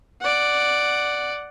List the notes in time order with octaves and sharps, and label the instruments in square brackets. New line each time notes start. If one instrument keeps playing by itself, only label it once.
[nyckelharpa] D5 F#5